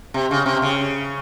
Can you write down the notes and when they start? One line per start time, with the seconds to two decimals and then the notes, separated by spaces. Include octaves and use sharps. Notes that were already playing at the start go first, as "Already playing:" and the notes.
0.14 C3
0.31 C#3
0.46 C3
0.62 C#3